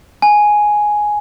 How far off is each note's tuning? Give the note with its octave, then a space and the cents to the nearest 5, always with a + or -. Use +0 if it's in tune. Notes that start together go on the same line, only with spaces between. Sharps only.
G#5 +5